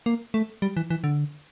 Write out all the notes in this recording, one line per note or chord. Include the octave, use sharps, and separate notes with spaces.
A#3
A3
G3
E3
E3
D3